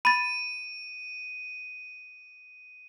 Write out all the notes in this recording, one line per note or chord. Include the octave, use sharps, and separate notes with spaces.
B5 A6 D#7